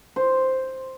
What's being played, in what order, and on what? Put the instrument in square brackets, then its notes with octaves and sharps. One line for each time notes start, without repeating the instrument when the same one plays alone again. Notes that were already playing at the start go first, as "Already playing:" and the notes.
[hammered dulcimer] C5